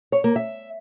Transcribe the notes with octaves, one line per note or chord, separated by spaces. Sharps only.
C#5
A#3
E5